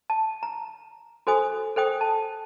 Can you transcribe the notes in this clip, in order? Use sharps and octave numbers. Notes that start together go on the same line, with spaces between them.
A5
A#5
F#4 A4 C5 G#5 D#6
A4 C5 G5 D#6
A5